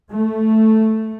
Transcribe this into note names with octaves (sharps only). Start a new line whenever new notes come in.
A3